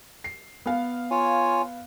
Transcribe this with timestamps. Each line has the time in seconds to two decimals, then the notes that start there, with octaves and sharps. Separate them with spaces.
0.24 C7
0.66 B3 F5
1.11 F4 C#5 G#5